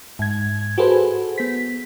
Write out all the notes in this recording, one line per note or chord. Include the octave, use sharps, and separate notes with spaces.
G#2 G#6
F#4 G#4 A4 B4 C5
B3 B6